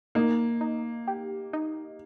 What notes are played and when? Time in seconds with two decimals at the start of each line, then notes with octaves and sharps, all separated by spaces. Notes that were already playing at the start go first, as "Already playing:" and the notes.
0.15 A#3 D#4
0.61 D#4
1.07 G4
1.53 D#4